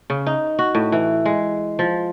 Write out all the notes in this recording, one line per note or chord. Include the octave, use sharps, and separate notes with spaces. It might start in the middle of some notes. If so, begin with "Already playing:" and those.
C#3
D#4
F#4
A2
E3
G#3
F3